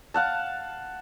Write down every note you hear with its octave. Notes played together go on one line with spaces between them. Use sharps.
F5 F#5 A5